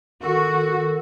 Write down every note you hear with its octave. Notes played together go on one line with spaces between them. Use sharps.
D#3 F#4 A4